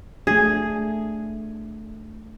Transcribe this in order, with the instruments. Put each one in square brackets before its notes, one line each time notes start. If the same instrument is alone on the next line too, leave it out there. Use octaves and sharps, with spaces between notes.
[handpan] A3 D4 [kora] G#4